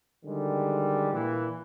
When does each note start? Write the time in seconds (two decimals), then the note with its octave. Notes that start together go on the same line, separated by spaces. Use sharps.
0.25 D3 D#3 G3 G#3
1.12 A#2 E3